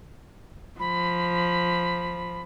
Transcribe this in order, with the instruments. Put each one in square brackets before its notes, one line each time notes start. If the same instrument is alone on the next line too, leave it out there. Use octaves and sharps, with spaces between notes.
[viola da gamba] F3 [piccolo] B5